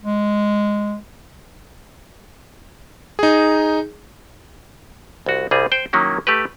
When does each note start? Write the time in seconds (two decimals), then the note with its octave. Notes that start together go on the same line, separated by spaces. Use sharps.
0.02 G#3
3.19 D#4 G#4
5.26 C2 F#4
5.51 C2 G3 G#4
5.72 C5 G5
5.93 D#3 F#3 A#3 C#4 E4
6.27 A3 G4 B4